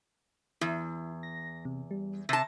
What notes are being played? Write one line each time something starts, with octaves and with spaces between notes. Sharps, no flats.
E2 E4
A#6
C3
G3
C3 A5 A#6